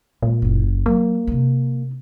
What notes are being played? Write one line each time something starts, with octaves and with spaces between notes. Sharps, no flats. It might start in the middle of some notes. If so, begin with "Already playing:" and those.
A#2 G#3
F#1 E4
F#3 A#3
C3 D#4